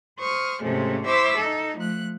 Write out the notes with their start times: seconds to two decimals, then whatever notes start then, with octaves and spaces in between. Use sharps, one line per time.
0.19 C5 C#6 D#6 F6
0.62 G#2 C3 F3 G#3 A3 C#4
1.06 E4 C5 E5 C#6 D6 E6
1.37 D#4 A4
1.77 F3 A3 F#6